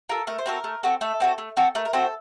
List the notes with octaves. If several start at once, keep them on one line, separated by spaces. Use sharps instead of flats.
F4 A4 A#4
A3 A#4
C5
C4 F#4 A4 A#4
A3
C4 F#4 A4
A3 A4
C4 F#4 A4
A3
C4 F#4 A4
A3 A#4
A#4
C4 F#4 A4 C5